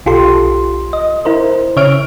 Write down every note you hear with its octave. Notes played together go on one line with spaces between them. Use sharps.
B1 F4 G4 A4 C6
D#5
E4 A#4 C5
C#3 C#5 E5 F6 D7